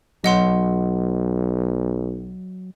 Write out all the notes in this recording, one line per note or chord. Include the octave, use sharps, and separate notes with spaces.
B1 F#3 D#5 F#5 C6